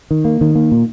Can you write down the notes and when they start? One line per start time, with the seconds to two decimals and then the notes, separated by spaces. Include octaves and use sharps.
0.11 D#3
0.25 A#3
0.41 D#3
0.55 A#3
0.72 A#2